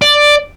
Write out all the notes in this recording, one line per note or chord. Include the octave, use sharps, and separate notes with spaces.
D5